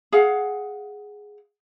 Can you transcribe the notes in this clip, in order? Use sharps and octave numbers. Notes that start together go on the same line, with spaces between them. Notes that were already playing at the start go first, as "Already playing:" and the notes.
G#4 F5 F#5